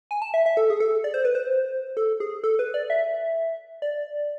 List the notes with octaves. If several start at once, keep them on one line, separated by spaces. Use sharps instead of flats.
G#5
A5
E5
E5
A4
G#4
A4
D5
C5
B4
C5
A4
G#4
A4
B4
D5
E5
D5